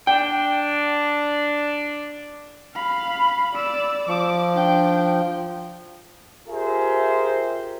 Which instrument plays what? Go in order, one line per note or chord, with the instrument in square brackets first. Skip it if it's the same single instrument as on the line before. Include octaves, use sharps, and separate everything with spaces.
[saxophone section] D4 [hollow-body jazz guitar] G5
[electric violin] F5 B5
D5 E6
[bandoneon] F3 [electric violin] D6
[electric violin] D4 G5
[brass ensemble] F4 G4 G#4 A#4 C5 E5